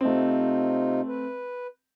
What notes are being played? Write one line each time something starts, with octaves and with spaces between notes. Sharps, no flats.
C3 A3 C4 D#4 F4
B4